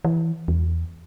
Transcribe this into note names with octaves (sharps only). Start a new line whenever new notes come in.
E3
E2